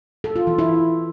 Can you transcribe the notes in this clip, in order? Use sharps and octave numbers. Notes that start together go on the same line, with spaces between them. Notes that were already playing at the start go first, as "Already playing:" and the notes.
A4
F4
E3
E4